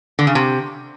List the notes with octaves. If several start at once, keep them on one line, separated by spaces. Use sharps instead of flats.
D3
C#3
C3